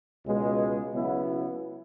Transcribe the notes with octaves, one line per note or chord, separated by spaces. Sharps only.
C#2 B2 G#3
C#3 F#3 B3 E4